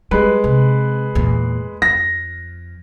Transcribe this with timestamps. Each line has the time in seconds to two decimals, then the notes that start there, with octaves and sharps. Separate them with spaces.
0.11 G3 G#3 B4
0.44 C3
1.15 E2 A#2
1.82 F2 A#6